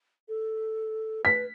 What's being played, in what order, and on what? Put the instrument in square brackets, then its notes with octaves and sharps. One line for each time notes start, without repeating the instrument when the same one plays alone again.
[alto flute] A4
[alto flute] B4 [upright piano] B6